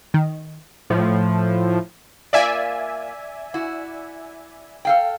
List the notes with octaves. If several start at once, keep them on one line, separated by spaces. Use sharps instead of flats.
D#3
A2 F3
A#3 F4 D5 E5 G#5
E4 F#4
A4 F5 G5